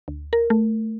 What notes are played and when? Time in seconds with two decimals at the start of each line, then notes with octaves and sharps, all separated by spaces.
0.08 D2
0.33 A#4
0.50 A3